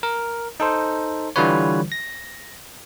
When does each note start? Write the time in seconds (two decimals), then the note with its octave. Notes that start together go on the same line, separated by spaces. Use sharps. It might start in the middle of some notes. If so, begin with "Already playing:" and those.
0.03 A#4
0.60 D#4 A4 C5
1.36 D3 E3 G3 F4 B4 C#5
1.92 A#6